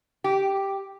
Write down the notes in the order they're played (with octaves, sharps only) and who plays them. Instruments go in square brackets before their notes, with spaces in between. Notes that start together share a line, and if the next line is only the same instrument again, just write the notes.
[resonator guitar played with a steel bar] G4